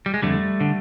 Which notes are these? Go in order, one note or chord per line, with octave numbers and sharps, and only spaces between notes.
G3
G#3
F2 D3 G3 A3
D3